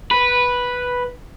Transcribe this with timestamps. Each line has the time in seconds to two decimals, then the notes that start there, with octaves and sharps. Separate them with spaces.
0.11 B4